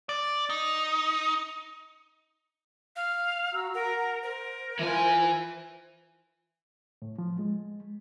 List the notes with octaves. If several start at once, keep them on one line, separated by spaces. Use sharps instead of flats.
D5
D#4
F5
F#4 A#5 E6
A#4 F#5 A#5
A#4 C5
E3 E4 F4 C5 G#5
A2
F3
G#3